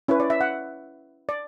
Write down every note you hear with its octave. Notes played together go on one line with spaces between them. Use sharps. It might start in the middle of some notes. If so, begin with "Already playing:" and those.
C#4 E4 B4 C#5
D5
E5
F#5
D5